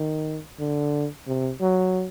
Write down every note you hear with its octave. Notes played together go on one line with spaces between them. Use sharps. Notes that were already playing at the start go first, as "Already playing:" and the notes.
Already playing: D#3
D3
C3
F#3